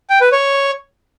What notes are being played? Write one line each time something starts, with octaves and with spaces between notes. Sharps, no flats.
G5
B4
C#5